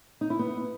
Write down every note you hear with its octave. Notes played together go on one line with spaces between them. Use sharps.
D#4
E4
B3